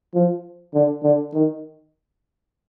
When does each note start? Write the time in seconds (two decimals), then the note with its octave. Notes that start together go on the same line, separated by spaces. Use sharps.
0.14 F3
0.74 D3
1.03 D3
1.34 D#3